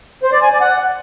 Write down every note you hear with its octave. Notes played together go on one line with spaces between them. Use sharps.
C5
D5
G#5
D5
F#5